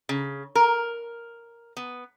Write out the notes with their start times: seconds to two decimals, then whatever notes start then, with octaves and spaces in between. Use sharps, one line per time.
0.09 C#3
0.55 A#4
1.77 B3